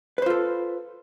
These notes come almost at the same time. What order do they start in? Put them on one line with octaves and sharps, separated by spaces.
B4 C5 F4 A4